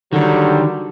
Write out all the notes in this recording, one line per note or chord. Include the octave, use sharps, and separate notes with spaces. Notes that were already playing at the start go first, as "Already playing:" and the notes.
D3 D#3 F#3 G3